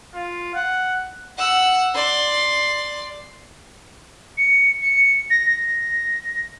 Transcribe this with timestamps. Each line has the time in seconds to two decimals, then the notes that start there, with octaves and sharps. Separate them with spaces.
0.15 F4
0.55 F#5
1.38 F#5 E6
1.95 D5 C6
4.37 C#7
4.82 C#7
5.30 A#6
5.45 A#6